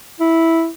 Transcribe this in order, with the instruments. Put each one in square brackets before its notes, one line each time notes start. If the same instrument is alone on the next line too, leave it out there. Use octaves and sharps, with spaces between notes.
[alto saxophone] E4